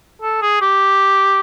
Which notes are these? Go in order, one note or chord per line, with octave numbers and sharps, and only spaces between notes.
A4
G#4
G4